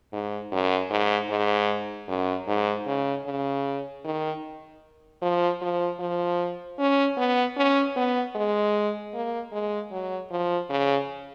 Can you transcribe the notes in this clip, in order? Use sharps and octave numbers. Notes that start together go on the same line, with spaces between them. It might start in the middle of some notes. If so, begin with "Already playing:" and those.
G#2
F#2
G#2
G#2
F#2
G#2
C#3
C#3
D#3
F3
F3
F3
C#4
B3
C#4
B3
G#3
A#3
G#3
F#3
F3
C#3